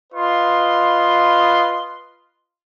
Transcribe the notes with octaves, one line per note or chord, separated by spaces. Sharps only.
F4 B4 D#5 C6